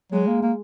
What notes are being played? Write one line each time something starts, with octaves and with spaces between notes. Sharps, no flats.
F#3 G#3
A#3
A#3